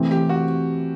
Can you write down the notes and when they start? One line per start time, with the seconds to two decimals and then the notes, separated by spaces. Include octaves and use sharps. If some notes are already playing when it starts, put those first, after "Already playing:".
Already playing: C3 E3 A3 C4
0.11 G4
0.29 F#4